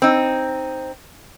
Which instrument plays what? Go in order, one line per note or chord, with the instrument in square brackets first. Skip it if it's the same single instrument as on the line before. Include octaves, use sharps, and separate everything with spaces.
[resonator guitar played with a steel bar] C4 D#4